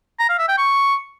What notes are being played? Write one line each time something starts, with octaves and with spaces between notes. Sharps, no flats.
A#5
F5
E5
G5
C#6